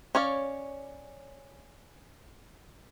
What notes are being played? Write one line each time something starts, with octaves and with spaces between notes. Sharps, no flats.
C#4 C#5 D5 F5